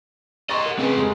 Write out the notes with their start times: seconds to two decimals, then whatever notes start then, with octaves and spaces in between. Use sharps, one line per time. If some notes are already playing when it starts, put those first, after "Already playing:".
0.49 G4 D#5 C6 C#6 A6
0.66 A#4 F#5
0.78 C#3 C4 G#4 B4
0.97 F1 G#3